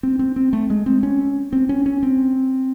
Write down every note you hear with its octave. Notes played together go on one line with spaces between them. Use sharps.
C4
C4
C4
A3
G#3
C4
C#4
C4
C#4
C#4
C4